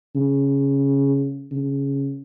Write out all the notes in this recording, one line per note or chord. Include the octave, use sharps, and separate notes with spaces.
C#3
C#3